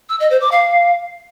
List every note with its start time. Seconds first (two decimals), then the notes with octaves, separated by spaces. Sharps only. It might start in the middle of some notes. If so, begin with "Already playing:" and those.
0.09 E6
0.20 D#5
0.30 C5
0.41 D6
0.52 F5